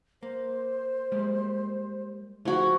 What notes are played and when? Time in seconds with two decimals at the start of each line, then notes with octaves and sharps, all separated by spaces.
0.23 A#3 C5
1.12 G3 G#3 A#3
2.45 F3 A3 F4 F#4 G#4